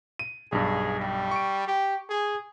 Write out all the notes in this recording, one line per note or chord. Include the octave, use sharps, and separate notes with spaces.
D#7
B1 G2 G#4
G3
C#6 D7
G4
G#4